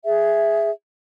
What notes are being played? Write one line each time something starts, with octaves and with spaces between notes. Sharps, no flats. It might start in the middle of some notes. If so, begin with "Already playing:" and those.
G#4 E5